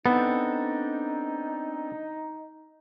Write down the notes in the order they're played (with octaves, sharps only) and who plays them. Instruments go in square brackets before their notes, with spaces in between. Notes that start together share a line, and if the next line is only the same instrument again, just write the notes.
[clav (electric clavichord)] B3 [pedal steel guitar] C4 D4 A4 [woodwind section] D#4